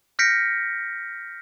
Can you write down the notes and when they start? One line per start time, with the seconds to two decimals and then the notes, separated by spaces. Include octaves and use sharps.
0.19 F6 G6 A#6 B6 C#7 D7